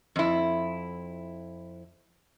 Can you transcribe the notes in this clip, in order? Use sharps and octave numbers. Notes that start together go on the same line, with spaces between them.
F2 E4